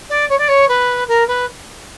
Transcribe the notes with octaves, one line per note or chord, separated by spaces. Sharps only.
D5
C#5
D5
C#5
B4
A#4
B4